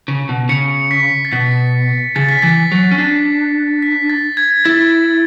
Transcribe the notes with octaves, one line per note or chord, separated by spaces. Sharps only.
C#3
B2
C#3 C#7
B6
A6
B2 B6
C#3 A6
B6
E3 A6
F#3
C#4
D4 A6
B6
A6
G#6
E4 A6